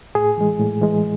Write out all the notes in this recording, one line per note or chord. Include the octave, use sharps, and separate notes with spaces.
A2 G#4
E3 G#3
A2
E3 G#3